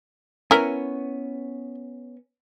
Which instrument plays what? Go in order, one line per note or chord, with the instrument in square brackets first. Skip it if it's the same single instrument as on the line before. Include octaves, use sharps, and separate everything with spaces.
[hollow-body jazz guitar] B3 C#4 [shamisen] E4 A#4